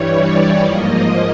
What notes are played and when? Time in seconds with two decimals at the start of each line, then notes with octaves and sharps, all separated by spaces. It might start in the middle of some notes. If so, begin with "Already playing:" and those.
Already playing: G2 E3 G3 C#5
0.17 D5
0.60 G#2 F3 A#3 D#5